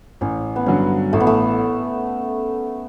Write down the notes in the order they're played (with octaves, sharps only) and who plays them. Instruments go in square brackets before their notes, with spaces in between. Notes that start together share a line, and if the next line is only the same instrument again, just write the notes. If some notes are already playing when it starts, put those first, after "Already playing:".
[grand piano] A1 [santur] C#4
[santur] B3
[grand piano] G2 D3 F#3 [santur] C#4
[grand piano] A1 [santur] A3
[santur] B3
A3